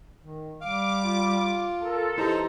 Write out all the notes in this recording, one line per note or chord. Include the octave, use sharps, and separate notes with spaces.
D#3
G3 F5 D6
F4
A4 A#4
E3 D#4 E4 G4 C5 A#5